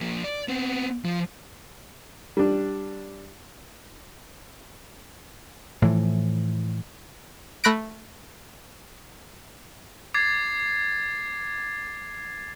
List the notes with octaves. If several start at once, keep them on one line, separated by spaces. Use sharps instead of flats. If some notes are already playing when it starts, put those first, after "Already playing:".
F3 A#3
D5
B3 C4
F3
G3 D4
A2 E3 F3
A3 B5 F#6 A#6 D7
D6 G#6 A6 C7